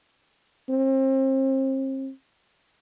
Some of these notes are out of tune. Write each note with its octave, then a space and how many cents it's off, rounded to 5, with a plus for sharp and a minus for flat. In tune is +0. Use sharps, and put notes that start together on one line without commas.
C4 +35